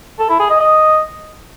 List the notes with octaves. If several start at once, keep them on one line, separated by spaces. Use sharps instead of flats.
A4
E4
G#4
D#5
D#5